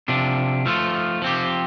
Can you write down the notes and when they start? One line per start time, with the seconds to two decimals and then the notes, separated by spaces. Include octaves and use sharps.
0.08 C3 F3 D4
0.66 F3 A3 F4
1.22 F3 C4 G4